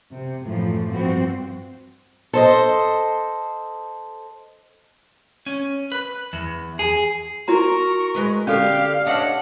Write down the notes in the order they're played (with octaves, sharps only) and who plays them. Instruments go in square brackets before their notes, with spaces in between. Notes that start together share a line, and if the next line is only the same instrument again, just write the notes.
[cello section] C3
F#2 A2 E3 F3 A3
G2 F3 C4 F#4
[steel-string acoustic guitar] A4 C5 D#5
[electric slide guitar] C#4
B4
E2
G#4
[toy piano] E4 F#4 A#5 [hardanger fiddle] A#4 [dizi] C#6
[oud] G#3 B4 D#5
[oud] D3 [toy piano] C#4 A4 [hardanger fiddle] G4 [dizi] F5
[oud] D4 C#5 E5 [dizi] D#5 [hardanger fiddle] F#5